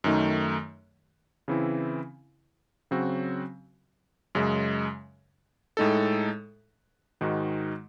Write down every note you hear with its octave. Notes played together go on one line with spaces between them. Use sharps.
F#2 D#3 A3 D#4
C#3 E3 C4 E4
C#3 F#3 C4 F#4
F#2 C#3 G#3
A2 G#3 D#4 A4
G#2 D#3 G#3 D#4 F#4